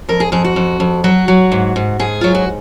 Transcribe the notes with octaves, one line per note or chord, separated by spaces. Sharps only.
F2 A#4
G#4
F2 G#4
F#4
F2
F2
F#3 F#4
F#3
G#2
G#2
G#2 G#4
F#3 F4
F#4